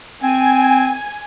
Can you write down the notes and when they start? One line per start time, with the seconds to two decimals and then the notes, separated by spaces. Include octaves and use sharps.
0.23 C4 G#5